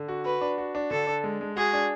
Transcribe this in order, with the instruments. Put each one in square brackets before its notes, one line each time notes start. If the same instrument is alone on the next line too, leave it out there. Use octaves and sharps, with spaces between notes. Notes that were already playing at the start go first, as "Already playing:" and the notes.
Already playing: [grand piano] D3
F#4
[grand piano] F#4 [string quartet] B4
[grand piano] D4
F#4
D4
[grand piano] D3 [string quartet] A4
[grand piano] D4
G#3
G#3
[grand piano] F#4 [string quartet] G#4
[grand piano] D4